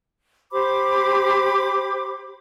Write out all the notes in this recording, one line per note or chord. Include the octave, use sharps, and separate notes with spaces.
G4 C5 B5 D6